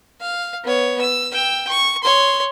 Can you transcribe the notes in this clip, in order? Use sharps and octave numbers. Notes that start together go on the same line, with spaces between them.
F5
B3 C#5
E6
G5 E6
C#6
C#5 C6